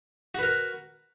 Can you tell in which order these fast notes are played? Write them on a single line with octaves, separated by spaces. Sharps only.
F#4 B4 A#4